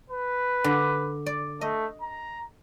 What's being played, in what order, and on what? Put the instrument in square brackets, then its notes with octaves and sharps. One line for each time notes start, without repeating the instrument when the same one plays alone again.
[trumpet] B4
[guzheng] D3
D5
[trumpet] A3 [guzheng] D#5
[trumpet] A#5